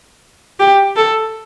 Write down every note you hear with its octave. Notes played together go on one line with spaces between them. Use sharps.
G4
A4